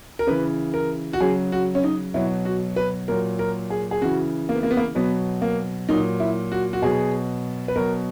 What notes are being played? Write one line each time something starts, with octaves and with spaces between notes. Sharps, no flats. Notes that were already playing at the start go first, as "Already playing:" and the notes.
A#4
C#3 E3 B4
A#4
F#4
C#3 F#3 G#4
F#4
C#4
D#4
B2 F#3 E4
F#4
B4
A#2 F#3 A#4
A#4
G#4
G#4
C#3 E3 F#4
A#3
B3
A#3
B3
A#3
B2 F#3 B3
A#3
A#2 F#3 D#4
E4
F#4
F#4
B2 F#3 G#4
B4
B2 F#3 A#4